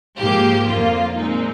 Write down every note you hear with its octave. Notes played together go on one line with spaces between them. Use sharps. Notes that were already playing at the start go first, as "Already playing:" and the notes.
G#2 F3 A#3 G4
F2 D3 F3 A#3 F4
A#2 G#3 C4 D#4